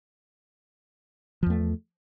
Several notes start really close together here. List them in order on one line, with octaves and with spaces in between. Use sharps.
F3 E2 A3